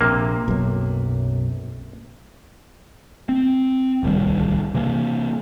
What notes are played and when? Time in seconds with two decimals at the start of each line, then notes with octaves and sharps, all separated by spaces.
0.01 A#1 C3 A#3
0.48 B1 F#2
3.29 C4
4.03 D1 C2 D#3 G3
4.74 C3 E3 A#3